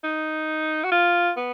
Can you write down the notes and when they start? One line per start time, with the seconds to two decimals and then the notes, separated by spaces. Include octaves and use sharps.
0.04 D#4
0.84 F#4
0.92 F4
1.37 B3